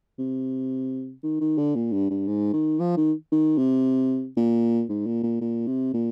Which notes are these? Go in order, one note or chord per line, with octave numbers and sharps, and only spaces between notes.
C3
D#3
D#3
D3
A#2
G2
G2
G#2
D#3
F3
D#3
D#3
C3
A#2
G#2
A#2
A#2
A#2
C3
A#2